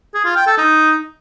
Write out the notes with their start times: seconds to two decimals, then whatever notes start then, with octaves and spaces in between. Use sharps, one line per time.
0.14 G#4
0.25 F4
0.36 G5
0.47 A4
0.58 D#4